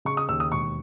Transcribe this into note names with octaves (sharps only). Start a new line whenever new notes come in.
C#3 C#6
D#6
D#2 E6
D#6
E1 C#6